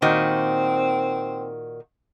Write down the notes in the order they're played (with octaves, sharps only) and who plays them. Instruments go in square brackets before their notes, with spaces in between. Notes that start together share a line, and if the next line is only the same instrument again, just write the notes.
[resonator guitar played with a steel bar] A#2 D#3 F#4 [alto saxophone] C4